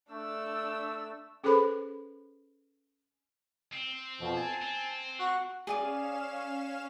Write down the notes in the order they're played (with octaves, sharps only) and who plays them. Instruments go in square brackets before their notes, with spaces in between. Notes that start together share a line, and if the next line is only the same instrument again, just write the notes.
[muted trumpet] A3 [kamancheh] D4 E6
[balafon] C#4 G#4 A4 B4 C5 B5
[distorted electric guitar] C4
[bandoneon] F2 B2 F3
G#5 A5
[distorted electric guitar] C4
[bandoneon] F#4 C#6 F#6
[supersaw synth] C#4 F5 E7 [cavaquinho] G#4 D5 D#6